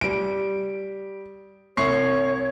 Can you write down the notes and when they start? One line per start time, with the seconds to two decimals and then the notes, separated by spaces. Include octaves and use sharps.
0.01 G3 D7
1.77 C2 C#5 C#6 C7